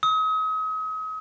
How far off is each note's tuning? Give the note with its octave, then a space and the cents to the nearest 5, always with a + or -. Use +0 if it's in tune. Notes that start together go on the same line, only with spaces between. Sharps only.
D#6 +40